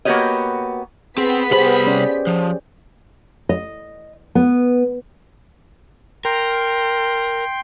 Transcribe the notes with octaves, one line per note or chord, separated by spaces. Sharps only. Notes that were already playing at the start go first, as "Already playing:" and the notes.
A#3 B3 F#4 G4 C#5 D#5
B3 C4 G#4 B6
C2 G4 G#4 C5 B5
C#4 D5
F3
D#5
B3
A#4 G5 C6